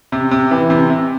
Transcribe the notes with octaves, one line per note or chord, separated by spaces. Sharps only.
C3
C3
E3
C3
C3